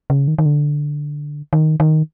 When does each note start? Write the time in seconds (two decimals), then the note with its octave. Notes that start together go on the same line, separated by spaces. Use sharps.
0.10 C#3
0.28 D#3
0.38 D#3
0.46 D3
1.53 D#3
1.80 D#3